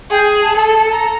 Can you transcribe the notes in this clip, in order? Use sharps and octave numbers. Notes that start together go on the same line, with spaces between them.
G#4 G5
G#5
A5
A4 A5
A5
A5
A#5